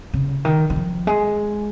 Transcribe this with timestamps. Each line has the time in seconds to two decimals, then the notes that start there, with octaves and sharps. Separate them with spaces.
0.13 C#3
0.45 D#3
0.70 D#3
0.76 F3
1.07 G#3